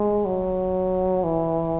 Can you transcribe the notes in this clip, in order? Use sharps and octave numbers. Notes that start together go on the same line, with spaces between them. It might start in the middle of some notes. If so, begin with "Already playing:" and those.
Already playing: G#3
F#3
E3